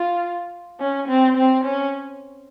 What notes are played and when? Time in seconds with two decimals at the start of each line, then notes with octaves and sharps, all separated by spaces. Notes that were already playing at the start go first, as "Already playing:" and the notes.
Already playing: F4
0.80 C#4
1.08 C4
1.37 C4
1.64 C#4